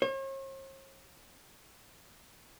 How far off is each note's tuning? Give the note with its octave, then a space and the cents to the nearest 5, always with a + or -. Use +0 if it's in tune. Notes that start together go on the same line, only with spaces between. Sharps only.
C#5 -45